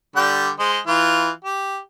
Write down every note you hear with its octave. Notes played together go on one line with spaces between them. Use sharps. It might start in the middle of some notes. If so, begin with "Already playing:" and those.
D3 G3 G5
G#3 C5 D#5
E3 F4
G4